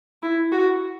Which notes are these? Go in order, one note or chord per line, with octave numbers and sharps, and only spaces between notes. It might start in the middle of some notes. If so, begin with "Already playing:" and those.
E4
F#4